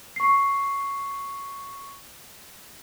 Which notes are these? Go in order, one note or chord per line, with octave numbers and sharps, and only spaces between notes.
C#6 C7